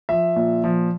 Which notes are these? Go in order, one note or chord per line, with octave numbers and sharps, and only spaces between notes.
F3 E5
A#2
F3